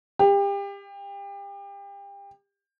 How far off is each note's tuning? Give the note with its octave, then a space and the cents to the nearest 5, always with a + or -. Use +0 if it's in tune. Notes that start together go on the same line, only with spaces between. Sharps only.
G4 +30